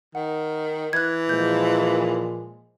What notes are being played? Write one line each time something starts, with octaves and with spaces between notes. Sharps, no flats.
D#3 F#5
E3 F#6 G#6
A#2 F3 G#3 G6